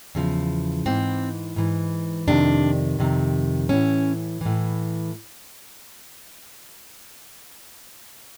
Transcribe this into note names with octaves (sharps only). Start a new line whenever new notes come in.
E2 C#3 F3
G#2 E3 C4
G#2 E3
F2 C3 D#3 D4
F2 C3 D#3
A2 E3 C#4
A2 E3